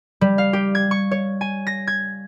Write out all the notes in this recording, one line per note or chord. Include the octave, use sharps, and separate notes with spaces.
G3
F5
G4
G#6
C#6
C#5
G#5
A#6
G#6